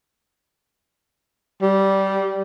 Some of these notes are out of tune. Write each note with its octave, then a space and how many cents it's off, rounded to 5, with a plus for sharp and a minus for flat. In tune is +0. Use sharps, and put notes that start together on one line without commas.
G3 -15